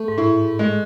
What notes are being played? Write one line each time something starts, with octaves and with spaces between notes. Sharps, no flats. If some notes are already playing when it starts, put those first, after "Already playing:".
Already playing: A3
G#2
A2 E4
G#2
G#3